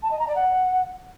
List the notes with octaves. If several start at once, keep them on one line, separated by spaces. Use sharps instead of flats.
A5
D#5
A#5
D5
F#5